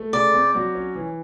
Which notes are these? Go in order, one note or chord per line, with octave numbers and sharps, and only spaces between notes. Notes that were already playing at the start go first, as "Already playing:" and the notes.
Already playing: A3
C#3 D5
C4
F#3
C#4
E3